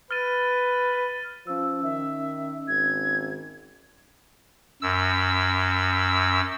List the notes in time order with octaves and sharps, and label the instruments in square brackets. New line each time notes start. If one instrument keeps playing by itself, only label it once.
[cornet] B4 [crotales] F6 A6 D#7
[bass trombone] F3 [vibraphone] C#4 E6
[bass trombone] D#3 [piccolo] E5
[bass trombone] G#1 [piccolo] G#6
[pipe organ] F#2 E6